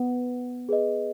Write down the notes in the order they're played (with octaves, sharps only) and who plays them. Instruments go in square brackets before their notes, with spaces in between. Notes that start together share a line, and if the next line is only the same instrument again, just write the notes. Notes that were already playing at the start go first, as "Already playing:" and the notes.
Already playing: [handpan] B3
[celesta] G#4 B4 D#5